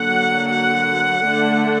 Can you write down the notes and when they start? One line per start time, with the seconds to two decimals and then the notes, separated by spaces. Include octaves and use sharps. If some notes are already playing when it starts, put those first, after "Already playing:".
Already playing: D3 F#3 A#3 F#5
0.52 F#5
1.24 D3 A3 D4